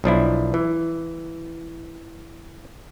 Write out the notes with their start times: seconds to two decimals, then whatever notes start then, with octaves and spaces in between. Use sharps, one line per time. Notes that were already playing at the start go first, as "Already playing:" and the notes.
0.04 B1 F3 D4 E4
0.54 E3